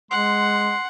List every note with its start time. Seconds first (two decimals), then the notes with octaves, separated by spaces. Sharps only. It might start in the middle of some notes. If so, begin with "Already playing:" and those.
0.11 G#3 F#5 C6